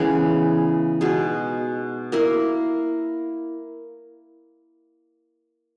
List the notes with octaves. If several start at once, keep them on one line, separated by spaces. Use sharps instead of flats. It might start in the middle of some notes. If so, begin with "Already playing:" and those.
Already playing: C#3 E3 G#3 B3
B2 G#3 D#4 G#4
A#3 E4 A#4